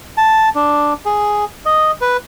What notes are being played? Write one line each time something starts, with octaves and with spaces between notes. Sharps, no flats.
A5
D4
G#4
D#5
B4